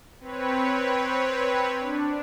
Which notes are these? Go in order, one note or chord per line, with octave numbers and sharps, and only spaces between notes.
C4 B4 C#5
D4